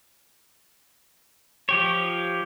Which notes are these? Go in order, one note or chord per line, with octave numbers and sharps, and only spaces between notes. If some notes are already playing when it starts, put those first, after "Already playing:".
F3 G4 C#5